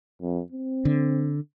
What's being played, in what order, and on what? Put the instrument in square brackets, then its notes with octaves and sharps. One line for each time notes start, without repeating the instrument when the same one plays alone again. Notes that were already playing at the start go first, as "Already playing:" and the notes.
[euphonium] F2
C4
[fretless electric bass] D3